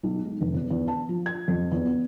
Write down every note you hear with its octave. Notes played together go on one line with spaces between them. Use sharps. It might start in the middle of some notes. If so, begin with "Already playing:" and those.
B1
G#3
F1
E2
E2
A5
F3
G#6
F2
E2
B3